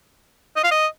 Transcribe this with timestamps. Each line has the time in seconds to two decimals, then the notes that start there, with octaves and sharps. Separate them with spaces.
0.56 D#5
0.64 F5
0.71 D#5